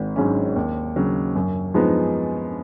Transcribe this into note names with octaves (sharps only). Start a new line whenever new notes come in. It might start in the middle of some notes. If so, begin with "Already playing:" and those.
Already playing: G#1
G#2 F#3 C#4
D#2
C#3 F#3
F#2
F3 G#3 B3 D#4